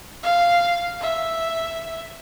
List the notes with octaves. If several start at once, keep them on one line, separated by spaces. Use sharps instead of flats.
F5
E5